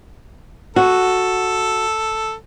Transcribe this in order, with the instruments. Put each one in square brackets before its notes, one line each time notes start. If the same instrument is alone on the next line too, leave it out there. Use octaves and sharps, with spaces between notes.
[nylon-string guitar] F#4 [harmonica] A4